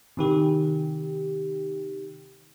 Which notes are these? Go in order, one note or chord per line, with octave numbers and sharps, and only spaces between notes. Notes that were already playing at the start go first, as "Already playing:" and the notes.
C3 D#3 G4